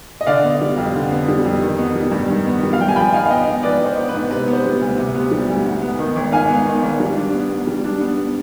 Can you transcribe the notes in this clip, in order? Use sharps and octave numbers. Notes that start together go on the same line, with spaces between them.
D#5
D3 D5 F5
B3
G3
F2
D3
B3
G3
F2
D#3
B3
G3
G2
D#3
B3
G3
F5
G2 G5
G#5
F3 G5 B5
D#4 F5 G#5
F5
B3 D#5 G5
G#2
F3 B4 D5
D#4
C5
B3
B4
G#2
C3 B4
B3
C5
G3
D2
C3
B3
G3
D2
G#2
B3
D#3
G#1
G#2 F5 G#5
B3
D#3
G#1
G3
D4
B3
G#2
G3
D4
B3